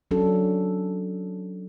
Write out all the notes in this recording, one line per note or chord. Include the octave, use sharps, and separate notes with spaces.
F#3 C#4 D4 F#4 A4